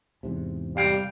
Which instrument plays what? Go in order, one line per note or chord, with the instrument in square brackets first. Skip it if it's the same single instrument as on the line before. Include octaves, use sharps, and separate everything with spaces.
[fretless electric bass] E2 G#2 C3
[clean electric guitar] C2 F5 G5 [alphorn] G3